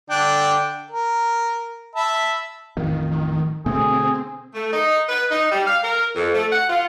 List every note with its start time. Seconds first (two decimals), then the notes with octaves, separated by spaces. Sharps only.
0.10 D3 D4 G5
0.91 A#4
1.95 E5 A5 B5
2.77 A1 F2 D#3
3.66 B2 D3 A3 C4 G#4
4.55 A3
4.73 D#4
5.09 B4
5.31 D#4
5.52 G3
5.66 F5
5.84 A#4
6.16 F2
6.35 A3
6.52 F#5
6.70 F4